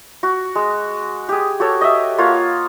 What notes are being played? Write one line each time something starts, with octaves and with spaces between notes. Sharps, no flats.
F#4
G#3
G4 G#4
F#4 G4 A4 C#5
D#5 E5
A#3 F4 C#5 F#5